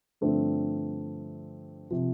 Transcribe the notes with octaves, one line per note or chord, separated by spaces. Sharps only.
G2 D3 F3 A3 C4
C3 F3